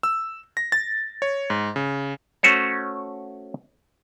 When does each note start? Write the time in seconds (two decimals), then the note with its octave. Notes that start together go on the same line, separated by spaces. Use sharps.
0.03 E6
0.57 A#6
0.72 A6
1.22 C#5
1.50 G#2
1.76 C#3
2.43 A3 C#4 F#4 C5 C#5